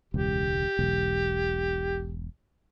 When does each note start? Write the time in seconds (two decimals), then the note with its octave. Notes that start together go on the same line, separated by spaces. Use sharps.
0.14 E1 C#2 G4
0.79 E1 B1